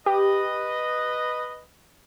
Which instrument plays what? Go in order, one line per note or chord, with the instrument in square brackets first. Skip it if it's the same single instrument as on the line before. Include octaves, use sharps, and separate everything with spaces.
[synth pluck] G4 [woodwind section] B4 D#5